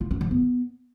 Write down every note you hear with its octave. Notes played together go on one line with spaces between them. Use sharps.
F4
C#4
F3
B3